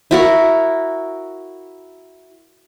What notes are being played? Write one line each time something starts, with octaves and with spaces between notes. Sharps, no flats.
E4 F#4 A#4